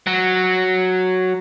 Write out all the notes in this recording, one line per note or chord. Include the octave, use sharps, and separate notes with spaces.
F#3